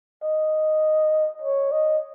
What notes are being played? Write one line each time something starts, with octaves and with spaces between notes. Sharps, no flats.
D#5
C#5
D#5